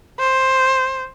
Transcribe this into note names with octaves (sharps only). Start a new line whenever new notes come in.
C5